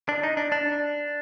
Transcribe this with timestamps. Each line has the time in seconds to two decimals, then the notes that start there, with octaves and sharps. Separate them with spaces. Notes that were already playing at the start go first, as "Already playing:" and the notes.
0.09 D4
0.24 D#4
0.37 D4
0.52 D4